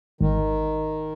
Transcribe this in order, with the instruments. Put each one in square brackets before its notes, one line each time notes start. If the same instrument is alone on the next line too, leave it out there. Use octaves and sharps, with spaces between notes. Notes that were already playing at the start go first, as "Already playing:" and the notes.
[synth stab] G#1 [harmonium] D#3